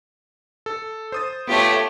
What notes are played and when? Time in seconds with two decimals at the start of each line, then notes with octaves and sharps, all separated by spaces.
0.66 A4
1.12 C5 D#6 A6
1.47 A3 B3 F4 G4 C#5